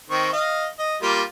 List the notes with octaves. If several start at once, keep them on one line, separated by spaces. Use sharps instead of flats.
D#3 C4 C#6
D#5 F5
D#5
G3 A#3 F4